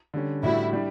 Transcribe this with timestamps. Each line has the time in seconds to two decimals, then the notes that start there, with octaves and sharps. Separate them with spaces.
0.14 D3 G3 C#4
0.43 A2 G3 D4 E4 F#4
0.73 G3 D4 G4